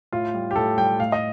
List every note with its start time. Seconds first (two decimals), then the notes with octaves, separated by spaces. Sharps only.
0.12 A2 F4
0.34 G3
0.51 G4
0.56 A2 A4
0.78 G3 G5
0.99 A2 F5
1.12 D#5